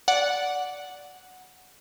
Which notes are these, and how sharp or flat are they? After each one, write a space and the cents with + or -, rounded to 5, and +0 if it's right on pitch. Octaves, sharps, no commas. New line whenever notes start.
D5 -15 F#5 -5